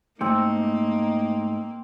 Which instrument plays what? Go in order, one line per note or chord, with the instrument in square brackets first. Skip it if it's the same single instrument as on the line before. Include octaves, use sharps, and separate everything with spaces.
[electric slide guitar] G#2 A3 [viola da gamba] A#3 [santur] C4 G4 [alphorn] D#4